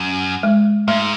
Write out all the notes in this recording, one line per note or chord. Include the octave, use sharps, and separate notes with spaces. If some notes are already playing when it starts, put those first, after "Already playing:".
Already playing: F#2
G#3
G#2 A3